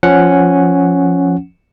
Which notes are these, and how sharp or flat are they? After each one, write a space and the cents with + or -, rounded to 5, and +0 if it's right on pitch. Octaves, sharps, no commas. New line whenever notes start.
F3 +0 C#4 +0 F#5 +0